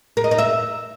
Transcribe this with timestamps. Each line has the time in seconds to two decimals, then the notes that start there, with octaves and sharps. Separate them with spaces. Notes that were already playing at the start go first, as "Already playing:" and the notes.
0.17 A#4
0.24 D#5
0.31 D#4
0.38 E5